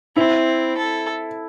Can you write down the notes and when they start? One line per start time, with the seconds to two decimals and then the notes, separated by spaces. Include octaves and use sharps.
0.16 C4 E4
0.77 A4